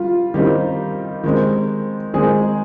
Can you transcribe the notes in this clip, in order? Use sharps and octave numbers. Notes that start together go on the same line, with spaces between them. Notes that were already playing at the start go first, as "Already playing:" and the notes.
Already playing: G3 F4
D#3 G3 C4 D#4 G4
D#3 G#3 C4
D#3 G#3 C4 G#4